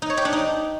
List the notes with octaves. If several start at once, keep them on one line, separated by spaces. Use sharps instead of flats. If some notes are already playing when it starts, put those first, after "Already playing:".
D#4
C#5
G4
D4
D#4